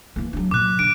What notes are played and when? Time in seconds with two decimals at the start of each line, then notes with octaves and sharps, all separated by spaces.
0.16 E3 A#3
0.33 F#3 D4
0.51 A#2 F#3 D6 F#6
0.79 D3 D7